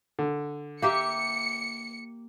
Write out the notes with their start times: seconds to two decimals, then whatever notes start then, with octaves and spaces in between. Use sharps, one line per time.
0.19 D3
0.82 A#3 G4 E5 C#7